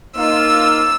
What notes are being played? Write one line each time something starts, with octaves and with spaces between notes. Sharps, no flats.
A#3 D#4 F4 E6